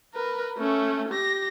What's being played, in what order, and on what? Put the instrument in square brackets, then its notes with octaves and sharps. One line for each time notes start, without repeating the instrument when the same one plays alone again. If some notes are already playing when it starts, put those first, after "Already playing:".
[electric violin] A#4 B4
A3 C#4
G4 A#6